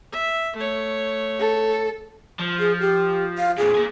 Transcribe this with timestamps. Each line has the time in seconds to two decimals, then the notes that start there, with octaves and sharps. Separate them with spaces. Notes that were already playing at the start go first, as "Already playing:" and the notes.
0.12 E5
0.56 A3 C#5
1.39 A4
2.40 F3
2.59 G#4
2.80 G4
3.38 F5
3.58 F2 A#2 G#4
3.75 A#3 G#5